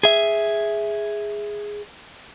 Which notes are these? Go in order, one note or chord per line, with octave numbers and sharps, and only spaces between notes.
G#4 E5